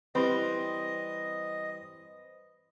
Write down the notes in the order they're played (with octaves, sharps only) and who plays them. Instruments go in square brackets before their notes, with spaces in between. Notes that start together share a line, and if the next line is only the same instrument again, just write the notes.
[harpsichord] E3 G3 [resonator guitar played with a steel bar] C4 [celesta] B4 B5 [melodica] D#5